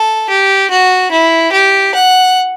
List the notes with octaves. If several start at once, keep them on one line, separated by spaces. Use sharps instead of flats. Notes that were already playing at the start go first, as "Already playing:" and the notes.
Already playing: A4
G4
F#4
E4
G4
F#5